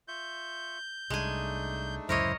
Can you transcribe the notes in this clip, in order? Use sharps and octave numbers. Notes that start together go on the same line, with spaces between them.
F4 E5 C#6 G6
C2 G#3 A3 D4 D#4 G#5
D1 C#2 F#2 E4 A#4 C5 C#5 D#5